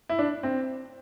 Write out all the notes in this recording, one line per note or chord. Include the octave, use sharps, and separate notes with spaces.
E4
D4
C4